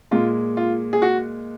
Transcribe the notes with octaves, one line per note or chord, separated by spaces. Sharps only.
A#2 G#3 F4
F4
G#4
F#4